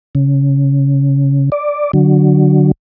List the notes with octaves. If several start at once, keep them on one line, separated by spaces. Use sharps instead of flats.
C#3
D5
D3 F#3